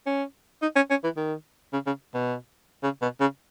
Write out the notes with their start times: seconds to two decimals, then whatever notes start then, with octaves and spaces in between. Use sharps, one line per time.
0.07 C#4
0.62 D#4
0.76 C#4
0.90 C#4
1.04 E3
1.17 D#3
1.73 C#3
1.86 C#3
2.14 B2
2.83 C#3
3.02 B2
3.20 C#3